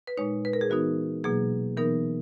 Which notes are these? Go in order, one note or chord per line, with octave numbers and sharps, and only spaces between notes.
B4
A#2 G#3 D#4 C#5
B4
A#4
G#4
E3 B3 D#4 F#4
B2 F#3 A#3 G#4
E3 B3 D#4 A#4